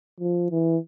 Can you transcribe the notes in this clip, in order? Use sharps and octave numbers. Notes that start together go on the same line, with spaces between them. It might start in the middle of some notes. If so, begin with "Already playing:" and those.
F3
E3